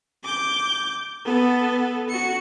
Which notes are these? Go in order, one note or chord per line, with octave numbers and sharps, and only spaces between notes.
D6 G6
B3 A4
F#4 C#7